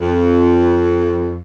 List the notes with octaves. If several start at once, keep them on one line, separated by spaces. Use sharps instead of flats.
F2